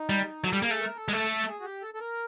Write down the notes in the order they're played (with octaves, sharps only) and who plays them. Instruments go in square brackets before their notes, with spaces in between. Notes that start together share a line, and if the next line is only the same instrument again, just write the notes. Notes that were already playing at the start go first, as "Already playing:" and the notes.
Already playing: [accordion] D#4
[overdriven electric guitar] G3
[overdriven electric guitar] F#3 [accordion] A4
[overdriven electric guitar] G3 [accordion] G4
[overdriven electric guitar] A#3 [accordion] G#4
[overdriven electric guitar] A3
[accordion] A#4
A4
[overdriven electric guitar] G#3
[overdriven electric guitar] A3 [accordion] A4
[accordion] A4
G#4
F#4
G4
A4
A4
A#4